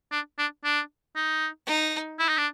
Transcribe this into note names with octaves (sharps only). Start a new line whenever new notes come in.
D4
D4
D4
D#4
D#4
E4
D#4
D4